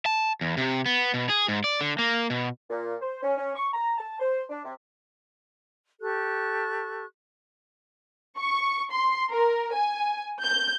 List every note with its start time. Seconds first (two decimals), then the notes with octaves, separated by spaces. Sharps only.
0.06 A5
0.41 E2
0.57 C3
0.86 B3
1.14 B2
1.29 G#4
1.48 G#2
1.64 D5
1.81 D3
1.99 A#3
2.30 B2
2.69 A#2
3.01 C5
3.23 C#4
3.37 C#4
3.55 C#6
3.73 A#5
3.98 A5
4.19 C5
4.49 D4
4.64 C3
6.01 G4 A4 C#6 F#6
8.37 C#6
8.91 C6
9.30 A#4
9.74 G#5
10.42 G6